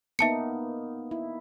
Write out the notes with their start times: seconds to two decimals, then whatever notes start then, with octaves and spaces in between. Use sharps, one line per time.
0.19 A#3 B3 D#4 E5 A5 C#7
1.11 E4